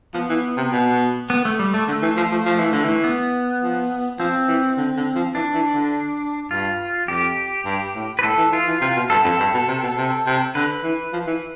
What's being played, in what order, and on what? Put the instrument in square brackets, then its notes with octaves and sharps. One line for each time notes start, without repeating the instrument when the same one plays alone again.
[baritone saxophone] F3 [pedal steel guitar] B3
[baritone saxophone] E3
C3
B2
[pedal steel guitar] B3
A3
G3
A3
[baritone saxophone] D3 [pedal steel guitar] A3
[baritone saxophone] E3
F3
F3
F3
E3
D3
E3
[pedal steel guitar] B3
[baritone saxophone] F3
[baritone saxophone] F3 [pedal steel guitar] C4
[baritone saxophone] E3
D3
D3
F3
[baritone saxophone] E3 [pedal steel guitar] D4
[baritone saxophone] E3
D3
[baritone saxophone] G2 [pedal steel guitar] F4
[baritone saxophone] F2 [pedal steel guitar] G4
[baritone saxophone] G2
A2
[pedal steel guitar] B4
[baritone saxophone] A2 [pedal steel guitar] A4
[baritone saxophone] E3
[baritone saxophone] E3 [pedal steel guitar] F4
[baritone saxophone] E3
[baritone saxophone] C3 [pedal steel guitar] F4
[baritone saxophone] B2
[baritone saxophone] G2 [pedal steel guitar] A4
[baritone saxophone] F2 [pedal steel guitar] A4
[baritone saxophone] G2
B2
C3
B2
C3
C3
[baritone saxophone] D3 [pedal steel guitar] B4
[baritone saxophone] E3
F3
E3